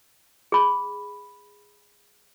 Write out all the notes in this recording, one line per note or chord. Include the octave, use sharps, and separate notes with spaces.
G#4 B5